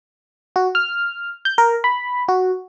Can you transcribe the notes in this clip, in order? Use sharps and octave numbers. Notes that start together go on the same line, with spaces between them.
F#4
F6
G6
A#4
B5
F#4